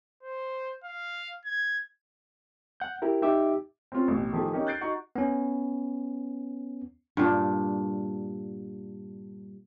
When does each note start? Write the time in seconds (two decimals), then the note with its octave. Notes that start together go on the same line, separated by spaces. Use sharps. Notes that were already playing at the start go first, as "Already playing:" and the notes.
0.23 C5
0.84 F5
1.45 G#6
2.80 F#5 G6
3.02 E4 G4 A#4
3.22 D#4 G4 E5 D6
3.92 C4 C#4 F4
4.08 A1 B2
4.32 A2 D#3 F3 G4 G#4
4.53 C#4 D#4 G4 A#4
4.67 F#6 G6 A6 C7 D7
4.81 D#4 F#4 A#5 C#6
5.16 B3 C#4
7.17 G2 A#2 D4